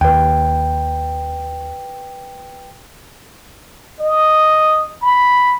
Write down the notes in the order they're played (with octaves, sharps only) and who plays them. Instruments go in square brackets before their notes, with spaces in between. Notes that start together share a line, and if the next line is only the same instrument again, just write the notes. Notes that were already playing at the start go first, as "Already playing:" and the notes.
[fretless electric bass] D#2 [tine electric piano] B4 G5
[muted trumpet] D#5
B5